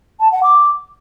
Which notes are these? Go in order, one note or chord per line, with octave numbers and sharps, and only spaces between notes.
A5
F#5
D6